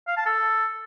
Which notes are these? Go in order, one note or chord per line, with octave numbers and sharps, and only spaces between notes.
F5
A5
A4